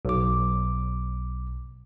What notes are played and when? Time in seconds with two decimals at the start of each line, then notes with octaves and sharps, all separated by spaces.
0.05 B1 D6